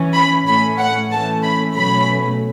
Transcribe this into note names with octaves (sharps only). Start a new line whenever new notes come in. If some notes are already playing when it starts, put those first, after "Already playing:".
Already playing: E3 C#4
B5
A2 A3 C#4 B5
F#5
E3 A3 C#4 A5
B5
B2 F#3 A3 C#4 B5